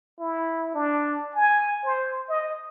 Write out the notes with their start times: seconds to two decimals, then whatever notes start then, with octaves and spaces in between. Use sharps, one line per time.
0.20 E4
0.74 D4
1.35 G#5
1.85 C5
2.29 D#5